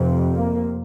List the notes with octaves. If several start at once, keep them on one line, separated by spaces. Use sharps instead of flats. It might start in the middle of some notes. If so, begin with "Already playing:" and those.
Already playing: F1 F2 C3
A#3